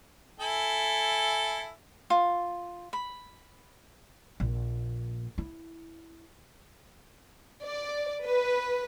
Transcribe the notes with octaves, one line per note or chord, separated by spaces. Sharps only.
E4 A4 G#5
F4
B5
A#1
E4
D5
B4